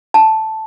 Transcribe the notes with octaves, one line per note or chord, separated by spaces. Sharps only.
A5